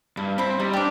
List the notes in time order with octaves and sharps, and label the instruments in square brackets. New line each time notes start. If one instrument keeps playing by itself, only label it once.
[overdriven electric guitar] G2 [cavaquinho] E4
[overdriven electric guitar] C4 [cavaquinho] E4 B5
[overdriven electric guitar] G3 [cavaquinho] D#4
[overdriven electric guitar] D4 [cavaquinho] G4 D5